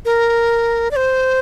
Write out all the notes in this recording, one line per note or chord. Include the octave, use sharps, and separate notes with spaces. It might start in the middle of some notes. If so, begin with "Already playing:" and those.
A#4
D5
C5